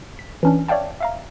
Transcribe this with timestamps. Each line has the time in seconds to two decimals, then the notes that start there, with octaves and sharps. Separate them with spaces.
0.19 B6
0.43 E3 C#4 D4
0.68 C#5 D5 E5 F5 G5 A5
1.01 E5 F5 A#5